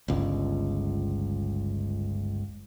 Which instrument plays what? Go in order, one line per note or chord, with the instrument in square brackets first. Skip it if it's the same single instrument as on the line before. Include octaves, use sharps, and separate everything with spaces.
[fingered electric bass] G1 C#2